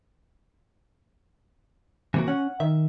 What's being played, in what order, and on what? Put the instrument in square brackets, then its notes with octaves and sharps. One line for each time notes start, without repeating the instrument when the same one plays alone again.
[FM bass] C3 [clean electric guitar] E3 A#3 F#4
[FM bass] C#4 [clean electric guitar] F#5
[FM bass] D#3 [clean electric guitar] E5